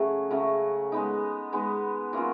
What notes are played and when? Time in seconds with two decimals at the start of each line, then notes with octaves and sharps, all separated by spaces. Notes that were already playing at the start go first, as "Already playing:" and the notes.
Already playing: C#3 F#3 A3
0.31 C#3 F#3 A3
0.92 G#3 B3 D#4
1.52 G#3 B3 D#4
2.13 F#3 A#3 C#4 F4